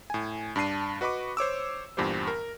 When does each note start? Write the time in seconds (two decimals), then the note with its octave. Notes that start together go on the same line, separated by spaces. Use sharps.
0.10 A2 G#5
0.56 G2 D4 A5 C7 D#7
1.01 F#4 B4 D#5 B5 C#6 D6
1.37 C5 C#5 D6 E6
1.97 E2 G2 A#2 G4 C5
2.27 A#4